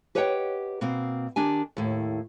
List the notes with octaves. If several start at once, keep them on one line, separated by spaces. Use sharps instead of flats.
G4 B4 C#5 D#5 F#5 G5
B2 A#3 C4
D#3 D4 G4 G#5
D#2 A2